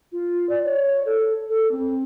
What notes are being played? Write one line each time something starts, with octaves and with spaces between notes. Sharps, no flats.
F4
D5
C#5
A4
A4
C4